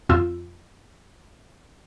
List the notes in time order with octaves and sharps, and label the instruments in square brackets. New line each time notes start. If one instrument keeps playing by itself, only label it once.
[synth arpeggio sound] F2 F4 E6